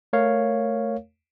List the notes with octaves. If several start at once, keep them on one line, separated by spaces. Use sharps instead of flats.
A3 A#4 C#5 F5